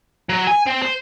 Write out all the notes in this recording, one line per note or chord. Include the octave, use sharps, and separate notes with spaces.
F#3
G#5
C4
C5